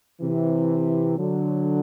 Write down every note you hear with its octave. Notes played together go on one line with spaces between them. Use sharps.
C3 E3
D3 F#3